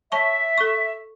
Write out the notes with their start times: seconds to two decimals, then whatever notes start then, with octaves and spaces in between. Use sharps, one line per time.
0.12 C#5 E5 A5 C#6
0.58 A4 C#6